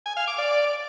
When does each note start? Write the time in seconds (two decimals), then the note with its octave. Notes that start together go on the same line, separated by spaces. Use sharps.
0.06 G#5
0.17 F5
0.27 D6
0.38 D5